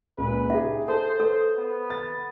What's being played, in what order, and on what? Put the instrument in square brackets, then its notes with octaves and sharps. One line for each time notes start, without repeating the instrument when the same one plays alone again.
[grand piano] C#2 A#2 [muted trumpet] B4
[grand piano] D#4 G4 G#4 [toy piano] E5
[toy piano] A4 [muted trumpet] C5 [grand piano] A5
[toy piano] A4 B4 [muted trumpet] C5
[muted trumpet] B3
[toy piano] B5 [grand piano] A6